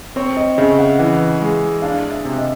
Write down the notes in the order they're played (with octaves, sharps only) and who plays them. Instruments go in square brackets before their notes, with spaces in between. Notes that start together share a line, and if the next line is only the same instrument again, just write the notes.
[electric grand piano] C4 [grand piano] C#5
[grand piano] D#5
[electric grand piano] C#3 [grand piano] E5
[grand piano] F#5
[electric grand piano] E3 [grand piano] F#5
[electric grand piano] G#3
[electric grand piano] D4 [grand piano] F5
[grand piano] E5
[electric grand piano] C3
[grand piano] D#5